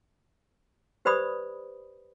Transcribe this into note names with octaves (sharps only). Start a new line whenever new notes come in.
G4 B4 C5 D5 B5 D#6